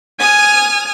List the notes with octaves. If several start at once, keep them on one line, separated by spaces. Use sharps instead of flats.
G#5 D#6 F6